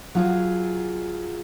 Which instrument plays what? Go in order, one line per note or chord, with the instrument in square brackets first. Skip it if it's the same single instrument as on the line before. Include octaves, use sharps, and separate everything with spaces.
[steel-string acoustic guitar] F#3 F4 G#4